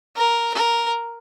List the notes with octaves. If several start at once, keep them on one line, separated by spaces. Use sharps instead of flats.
A#4
A#4